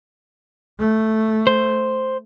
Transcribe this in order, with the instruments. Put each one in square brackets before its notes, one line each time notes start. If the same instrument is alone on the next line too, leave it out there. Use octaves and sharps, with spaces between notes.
[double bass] A3
[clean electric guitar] C5